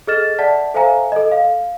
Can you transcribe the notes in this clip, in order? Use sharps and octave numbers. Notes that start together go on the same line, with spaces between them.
G#4 A4 D#5 F6 A6 E7
D5 E5 F#5 A5 B6
A4 C5 E5 F5 G#5 A#5
A4 D#5
F5